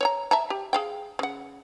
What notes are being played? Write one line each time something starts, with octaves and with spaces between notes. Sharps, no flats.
C#5 D5 A#5
E5 A5 A#5
G4
G#4 F5 G5
C#3 F#5